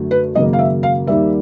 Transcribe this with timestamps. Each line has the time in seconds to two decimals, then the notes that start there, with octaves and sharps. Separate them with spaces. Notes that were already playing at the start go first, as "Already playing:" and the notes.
Already playing: F#2 D3 F#3 A3
0.11 B4
0.35 G#1 F#2 C#3 F#3 A#3 D#5
0.53 F5
0.59 E5
0.83 F5
1.07 D#2 D#3 G3 A#3 E5